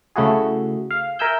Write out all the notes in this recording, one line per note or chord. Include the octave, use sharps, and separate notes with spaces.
C#3 A3 E4 F#4 G#4
F5
A#4 E5 G#5 E6 G6